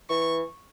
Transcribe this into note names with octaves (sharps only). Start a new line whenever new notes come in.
E3 C#6